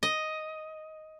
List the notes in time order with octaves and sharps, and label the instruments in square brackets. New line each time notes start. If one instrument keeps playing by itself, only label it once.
[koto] D#5